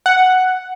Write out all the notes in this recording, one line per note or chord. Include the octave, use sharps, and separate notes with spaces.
F#5